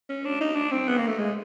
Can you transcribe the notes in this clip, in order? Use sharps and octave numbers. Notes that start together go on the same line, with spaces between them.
C#4
D4
D#4
D4
C4
B3
A#3
A3
G#3